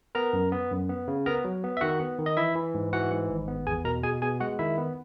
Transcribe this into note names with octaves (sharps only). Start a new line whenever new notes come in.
B3 A#4 A#5
F#2
B3
F#2
B3
C#3
B3 A#4 A#5
F#3
B3
E5
D#3 F#4 F#5
B3
D#3
D#5
E3 E4 E5
E3
G#2
E3 F#4 F#5
G#2
G#1
B3
E2 G#4 G#5
B2 A#4 A#5
B2 G#4 G#5
B3 G#4 G#5
G#3 F#4 F#5
D#3 E4 E5
B3